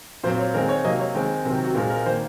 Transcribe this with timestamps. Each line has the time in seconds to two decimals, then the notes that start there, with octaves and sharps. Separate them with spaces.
0.24 A#2 F#3 C4 C5
0.39 C#5
0.54 D#3 G#3 C4 A#4
0.69 C#5
0.84 C3 F#3 A#3 D#5
1.00 C#5
1.15 D#3 G#3 C4
1.45 C3 D#3 F#3 C4
1.65 F#4
1.75 A#2 G#3 C4 A#4
1.90 A#4
2.06 D#3 C5
2.09 A#3